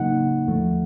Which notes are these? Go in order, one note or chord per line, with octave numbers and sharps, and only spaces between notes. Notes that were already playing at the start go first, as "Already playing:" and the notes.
Already playing: C#3 F#3 A#3 D#4 F#5
D#2 D3 F3 A3